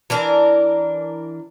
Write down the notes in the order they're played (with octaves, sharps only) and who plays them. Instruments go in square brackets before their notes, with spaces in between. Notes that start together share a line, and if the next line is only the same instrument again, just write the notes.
[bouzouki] E3 D4 A#4